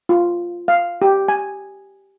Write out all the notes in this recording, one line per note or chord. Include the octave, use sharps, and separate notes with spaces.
F4
F5
G4
G#5